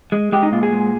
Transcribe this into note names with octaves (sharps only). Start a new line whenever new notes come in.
G#3
G#3 G4
D#4
A#2 F4
G#4
G#3